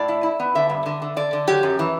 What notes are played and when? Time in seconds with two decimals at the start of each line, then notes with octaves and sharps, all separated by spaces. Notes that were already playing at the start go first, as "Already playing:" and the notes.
Already playing: A2 D5
0.08 E4
0.23 E4
0.40 B3
0.55 D3 E5
0.70 G2
0.86 D3
1.02 D3
1.16 D3 D5
1.33 D3
1.48 F#3 G4
1.63 F#2
1.79 E3